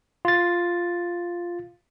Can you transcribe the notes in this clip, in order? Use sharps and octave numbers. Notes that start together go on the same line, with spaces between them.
F4 A6